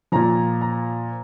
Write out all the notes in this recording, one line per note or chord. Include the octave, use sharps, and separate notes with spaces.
A#2 F3 A#5
A#5